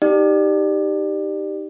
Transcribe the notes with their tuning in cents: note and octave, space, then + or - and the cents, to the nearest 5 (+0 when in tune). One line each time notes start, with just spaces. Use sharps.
D#4 +0 G4 +0 D5 +25